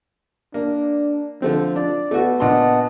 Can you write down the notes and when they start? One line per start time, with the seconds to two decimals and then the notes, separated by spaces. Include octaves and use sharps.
0.54 A#3 D4
1.42 D3 F3 A3 C4
1.76 D4 D5
2.11 A3 B3 F#4
2.40 A#1 D4 D#5 F#5 A5 C6